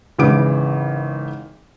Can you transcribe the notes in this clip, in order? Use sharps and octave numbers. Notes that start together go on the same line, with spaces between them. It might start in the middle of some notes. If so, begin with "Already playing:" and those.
G#1 C#3 E3 D6 D7